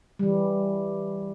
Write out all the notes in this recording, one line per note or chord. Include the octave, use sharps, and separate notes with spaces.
E3 G3